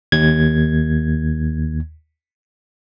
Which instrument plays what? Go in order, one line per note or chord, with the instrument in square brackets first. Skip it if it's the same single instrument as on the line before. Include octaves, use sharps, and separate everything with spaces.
[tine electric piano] D#2 G#6